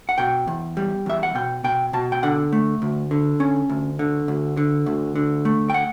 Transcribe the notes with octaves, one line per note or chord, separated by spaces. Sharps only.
F#5
B2 G5
E2
G3
E2 E5
F#5
B2 G5
B2 G5
B2 A5
G5
D3 F#5
A3
D2
D3
C#4
D2
D3
D2
D3
D2
D3
A3
G5
F#5